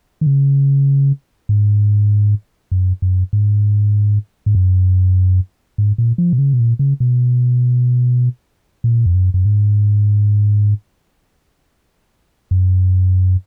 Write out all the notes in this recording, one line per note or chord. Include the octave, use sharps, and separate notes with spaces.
D#3
C#3
G#2
F#2
F#2
G#2
G#2
F#2
G#2
A#2
F3
B2
C#3
B2
A#2
C#3
B2
A#2
F2
F#2
F#2
G#2
F#2